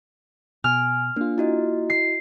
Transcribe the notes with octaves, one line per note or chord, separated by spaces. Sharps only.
B2 G#5 F6
A#3 D4 F4
E4 F#4 D#5
C7